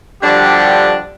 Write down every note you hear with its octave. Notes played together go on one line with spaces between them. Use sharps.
D3 F3 G3 D4 F#4 G4